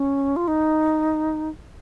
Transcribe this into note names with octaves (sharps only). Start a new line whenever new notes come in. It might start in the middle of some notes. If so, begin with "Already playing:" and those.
Already playing: C#4
F4
D#4